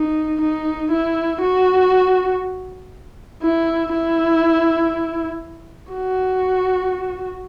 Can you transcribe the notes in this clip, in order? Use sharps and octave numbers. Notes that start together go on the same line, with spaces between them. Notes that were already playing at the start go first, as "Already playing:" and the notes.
Already playing: D#4
D#4
E4
F#4
E4
E4
F#4